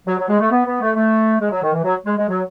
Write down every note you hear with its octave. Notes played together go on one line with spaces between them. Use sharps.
F#3
F#3
G#3
A3
B3
B3
A3
A3
G#3
F#3
D#3
E3
F#3
G#3
G#3
F#3